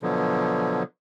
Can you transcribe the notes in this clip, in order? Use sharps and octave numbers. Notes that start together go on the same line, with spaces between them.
B2 D3 F3 F#3